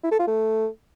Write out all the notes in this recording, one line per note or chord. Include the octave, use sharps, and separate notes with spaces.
E4
A4
F4
A3